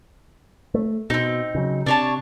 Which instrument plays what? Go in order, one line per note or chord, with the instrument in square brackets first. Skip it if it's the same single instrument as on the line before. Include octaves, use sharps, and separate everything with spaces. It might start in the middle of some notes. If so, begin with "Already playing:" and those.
[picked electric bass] A3
[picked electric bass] B2 [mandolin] C4 D#4
[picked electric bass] C#3 F#3
[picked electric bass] C3 [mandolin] D4 C#5 A5